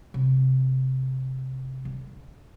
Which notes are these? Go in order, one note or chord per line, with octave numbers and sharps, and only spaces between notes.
C3
D3